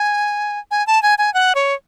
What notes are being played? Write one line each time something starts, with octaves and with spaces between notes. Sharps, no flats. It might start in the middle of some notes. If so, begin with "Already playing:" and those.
Already playing: G#5
G#5
A5
G#5
G#5
F#5
C#5